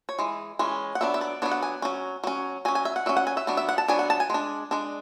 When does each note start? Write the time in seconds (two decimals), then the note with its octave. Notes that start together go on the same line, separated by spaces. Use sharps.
0.09 C#5
0.19 E3 G#3
0.59 E3 G#3 C#4
0.95 F#5
1.01 F#3 B3 D4 E5
1.14 E5
1.21 D5
1.42 F#3 B3 D4 C#5
1.51 F#5
1.63 G#5
1.82 F#3 C#4
2.24 F#3 C#4
2.65 F#3 G#5
2.68 C#4
2.75 G#5
2.85 E5
2.96 F#5
3.06 F#3 C#4 E5
3.17 F#5
3.27 G#5
3.37 E5
3.47 F#3 B3 D4
3.57 E5
3.69 F#5
3.78 A5
3.88 F#3 B3 D4 G#5
3.99 F#5
4.10 A5
4.20 G#5
4.30 G#3 D4
4.71 G#3 D4